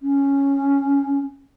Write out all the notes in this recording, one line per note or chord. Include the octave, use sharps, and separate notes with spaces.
C#4